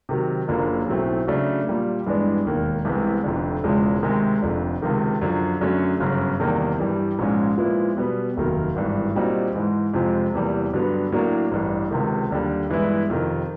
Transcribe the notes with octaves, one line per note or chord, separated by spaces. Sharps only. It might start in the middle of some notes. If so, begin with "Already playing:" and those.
C3 D#3 F#3
F#1 F#2 D3 F3 A#3
B1 A2 F#3 A3 C4
C#3 F#3 A3 D4 F#4
A#2 G3 A#3
G2 E3 G#3 B3 D4
E1 D#2 D#3
C2 C3 E3 G#3 B3
F1 F2 D3
E1 E2 C#3 F3 G#3
D2 C3 D#3 G#3
F1 F2 D3
C#2 C3 D#3
F#2 D3 F3
F#2 D3 F#3 A3 C#4
G1 F#2 C#3
E2 C3 D#3 G3 A#3
G2 E3 G3
A#1 G#2 F3 G#3 C#4
A#2 F3 G#3 B3 E4
B2 G3 B3
F1 D#2 D#3 F#3
G#1 G2 E3
A#2 G3 C4 D#4 F#4
G#2 E3 G#3
F2 C3 F3 G#3 C4
E2 C3 E3 G3 A#3
G2 D3 F#3 B3
A2 F#3 A#3 D4
A1 G2 E3
C#2 C3 D#3
D#2 D3 G3
G2 E3 G#3 B3 E4
F2 C3 D#3